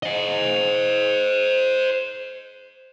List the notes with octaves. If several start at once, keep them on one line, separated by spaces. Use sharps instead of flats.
C5 D#5